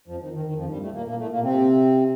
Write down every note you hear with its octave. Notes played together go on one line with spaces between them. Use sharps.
F2 F3
D#3
D#3
D#3
F2 F3
G2 G3
A2 A3
A#2 A#3
A#2 A#3
A2 A3
A#2 A#3
C3 C4